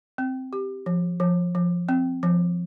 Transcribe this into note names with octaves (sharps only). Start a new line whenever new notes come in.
C4
G4
F3
F3
F3
C4
F3